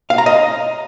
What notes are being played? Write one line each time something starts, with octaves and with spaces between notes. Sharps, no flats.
F5
A#5
D#5